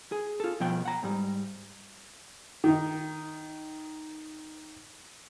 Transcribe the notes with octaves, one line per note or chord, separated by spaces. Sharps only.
G#4
F4 A4
B2 F3 G5
F#5 A#5
G#2 G3
D#3 D#4